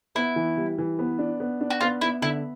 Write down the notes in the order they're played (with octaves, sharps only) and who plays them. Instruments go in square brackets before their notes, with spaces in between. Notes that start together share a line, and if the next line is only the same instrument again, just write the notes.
[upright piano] B3 [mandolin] E4
[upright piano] E3
G3
E3
B3
D4
B3
D4
[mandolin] F#4
[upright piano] B3 [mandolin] F4
[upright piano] B3 [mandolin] E4
[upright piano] D3 [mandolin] E4